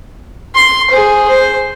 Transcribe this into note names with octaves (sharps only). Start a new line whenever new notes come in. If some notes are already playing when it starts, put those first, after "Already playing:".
C6
G#4 C5
C5